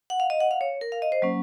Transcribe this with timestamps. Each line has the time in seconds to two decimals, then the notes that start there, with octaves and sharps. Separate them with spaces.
0.10 F#5
0.20 F5
0.30 D#5
0.40 F#5
0.51 F5
0.61 C#5
0.81 A#4
0.92 F5
1.02 D#5
1.12 C5
1.22 F#3 A#3 C#4